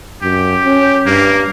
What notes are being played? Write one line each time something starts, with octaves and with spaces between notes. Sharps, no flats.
F#2 G4
C#4
G2 A#3